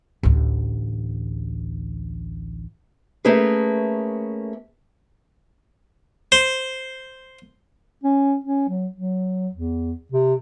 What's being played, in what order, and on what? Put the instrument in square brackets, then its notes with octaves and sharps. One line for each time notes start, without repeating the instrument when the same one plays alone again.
[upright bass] A1 D2
[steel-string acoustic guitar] A3 A#3 C#4 G#4 B4
[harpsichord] C5
[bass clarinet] C#4
C#4
F#3
F#3
E2
C3